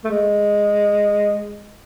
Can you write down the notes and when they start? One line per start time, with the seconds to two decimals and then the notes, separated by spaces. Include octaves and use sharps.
0.04 A3
0.11 G#3